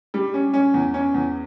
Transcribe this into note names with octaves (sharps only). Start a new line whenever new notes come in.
G3
C#4
C#4
E2
C#4
E2